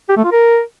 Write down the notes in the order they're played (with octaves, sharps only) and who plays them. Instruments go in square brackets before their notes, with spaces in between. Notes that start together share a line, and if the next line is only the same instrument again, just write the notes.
[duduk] G4
A3
F4
A#4